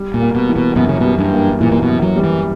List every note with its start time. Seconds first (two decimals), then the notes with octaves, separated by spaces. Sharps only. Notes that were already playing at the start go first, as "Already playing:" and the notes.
Already playing: G3
0.14 A#2
0.20 A#3
0.35 B2
0.49 E3
0.56 B2
0.76 F#2 B2
0.89 C#3
1.00 B2 G3
1.19 G2
1.32 A#3
1.60 A#2 E3
1.72 A#2
1.82 B2
1.88 F#2
2.02 F#3
2.16 G3
2.24 E3